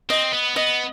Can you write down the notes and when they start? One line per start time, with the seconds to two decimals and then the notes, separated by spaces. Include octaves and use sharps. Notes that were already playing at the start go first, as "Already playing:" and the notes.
0.10 C4 D#5
0.33 B3
0.56 B3 D#5